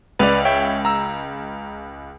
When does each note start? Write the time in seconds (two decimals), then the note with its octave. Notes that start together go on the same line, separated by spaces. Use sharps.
0.19 C#2 B4 D5 F7
0.45 C#5 E5 G5
0.85 A#5 E6